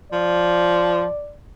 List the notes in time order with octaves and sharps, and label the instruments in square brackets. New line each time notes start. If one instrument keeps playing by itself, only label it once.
[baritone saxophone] F3 [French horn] D5